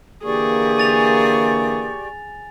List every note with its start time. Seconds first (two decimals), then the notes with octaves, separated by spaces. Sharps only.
0.24 D3 E3 A#3 G4 G#4 D5 C#6
0.78 G#5 A6 F7